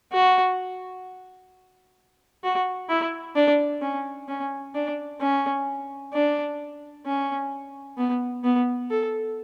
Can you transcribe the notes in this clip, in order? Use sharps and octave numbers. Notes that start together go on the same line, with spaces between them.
F#4
F#4
E4
D4
C#4
C#4
D4
C#4
D4
C#4
B3
B3
A4